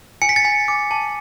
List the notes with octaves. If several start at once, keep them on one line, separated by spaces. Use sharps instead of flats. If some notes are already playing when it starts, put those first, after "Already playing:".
G#5 C#7
B6
A6 C#7
G#5
D6
A5